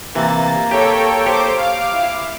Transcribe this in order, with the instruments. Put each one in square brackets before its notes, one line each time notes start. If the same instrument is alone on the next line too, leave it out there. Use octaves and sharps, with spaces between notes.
[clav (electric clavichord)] C3 E3 [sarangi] A#3 [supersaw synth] A6
[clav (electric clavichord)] G4 [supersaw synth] A4 C#5 G5
[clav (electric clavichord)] G4 C#5 [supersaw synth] C5 D6
[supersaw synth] F5 D6
[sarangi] E4